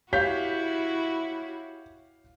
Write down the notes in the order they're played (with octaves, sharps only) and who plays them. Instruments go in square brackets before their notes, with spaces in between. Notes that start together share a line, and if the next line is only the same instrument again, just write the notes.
[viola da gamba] E4 F#4 [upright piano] G4 C#5 [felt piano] F5 G6 B6